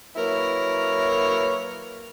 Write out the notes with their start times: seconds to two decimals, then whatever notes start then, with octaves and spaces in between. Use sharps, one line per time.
0.16 F#3 A#3 E4 A#4 B4 C#5